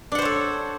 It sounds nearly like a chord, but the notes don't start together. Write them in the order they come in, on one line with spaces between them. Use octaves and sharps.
D4 F#5 C5 C#5 A4